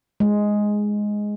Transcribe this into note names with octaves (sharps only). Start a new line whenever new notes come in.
G#3